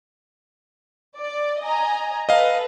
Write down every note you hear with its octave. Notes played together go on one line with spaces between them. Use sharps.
D5
D#5 G#5 A#5
A4 B4 D#5 F5